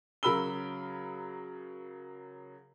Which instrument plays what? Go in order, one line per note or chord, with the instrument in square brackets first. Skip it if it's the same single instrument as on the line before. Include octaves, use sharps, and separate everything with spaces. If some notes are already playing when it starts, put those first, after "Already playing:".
[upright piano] C#3 F#3 A#4 B5 E6 G7